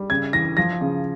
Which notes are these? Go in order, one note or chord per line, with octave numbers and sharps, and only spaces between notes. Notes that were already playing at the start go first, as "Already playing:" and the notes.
Already playing: G3
C#3 G#6
E3 A#6
F3 A#6
C#3